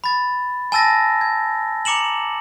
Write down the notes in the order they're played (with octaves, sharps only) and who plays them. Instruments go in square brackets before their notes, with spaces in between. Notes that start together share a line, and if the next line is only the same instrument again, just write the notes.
[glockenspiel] B5 A6
G#5 A5 E6 A6 A#6
G#6
A#5 D6 C#7 E7 F#7